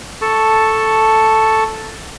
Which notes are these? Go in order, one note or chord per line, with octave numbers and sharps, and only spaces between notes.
A4 A5 C#6